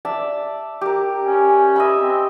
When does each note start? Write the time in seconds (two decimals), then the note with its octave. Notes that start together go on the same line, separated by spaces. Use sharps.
0.05 D5 E5 A5
0.81 G4 A#4
1.23 C#4
1.76 D#5 E5 B5
1.98 C4